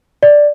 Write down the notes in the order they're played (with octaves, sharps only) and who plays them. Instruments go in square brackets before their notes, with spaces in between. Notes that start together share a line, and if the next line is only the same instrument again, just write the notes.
[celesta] D5